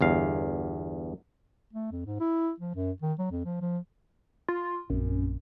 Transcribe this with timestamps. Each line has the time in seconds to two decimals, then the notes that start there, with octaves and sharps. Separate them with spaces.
0.01 G1 E2 F5
1.73 A3
1.92 F2
2.06 G#2
2.20 E4
2.60 F3
2.75 F#2
3.02 D#3
3.19 F#3
3.31 F2
3.45 F3
3.61 F3
4.48 F4
4.90 A#1 F#2 C4